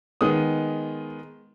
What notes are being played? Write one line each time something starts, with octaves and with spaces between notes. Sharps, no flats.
D#3 G#3 B3 D#6